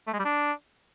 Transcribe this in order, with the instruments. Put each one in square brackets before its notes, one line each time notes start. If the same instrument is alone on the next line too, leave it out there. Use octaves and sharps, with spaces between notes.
[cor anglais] A3
G#3
G3
D4